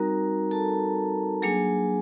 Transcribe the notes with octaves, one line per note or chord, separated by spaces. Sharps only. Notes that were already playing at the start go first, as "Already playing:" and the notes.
Already playing: G3 C4 D#4 F#4 A#4 A#5
A4 A5
F#3 A#3 D4 G#4 G#5